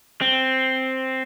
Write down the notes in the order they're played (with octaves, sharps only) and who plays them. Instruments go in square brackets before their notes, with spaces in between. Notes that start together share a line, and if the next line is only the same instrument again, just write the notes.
[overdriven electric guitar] C4